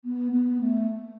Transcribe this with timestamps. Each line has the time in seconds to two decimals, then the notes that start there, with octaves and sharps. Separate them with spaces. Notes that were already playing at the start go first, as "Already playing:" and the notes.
0.05 B3
0.32 B3
0.61 A3